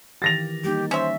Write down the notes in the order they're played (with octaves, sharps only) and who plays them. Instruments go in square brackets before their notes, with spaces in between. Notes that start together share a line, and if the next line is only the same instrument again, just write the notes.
[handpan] D#3 E3 G4 [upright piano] A6 A#6 F7
[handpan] G3 A#3 D#4 [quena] G4
[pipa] C#4 E5 [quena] C5